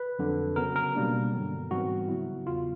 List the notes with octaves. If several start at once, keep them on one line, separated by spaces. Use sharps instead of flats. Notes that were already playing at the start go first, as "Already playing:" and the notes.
Already playing: B4
F2 D3 F#3
C#3 F#3 B3 A#4
A#4
B2 G3 A#3 D4
G2 D3 F#3 B3
G#2 E3 G3 C4 F#4
C#3 F#3 B3 E4
E2 C#3 F#3 F4